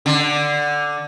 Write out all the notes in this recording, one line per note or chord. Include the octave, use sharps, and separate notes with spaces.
D3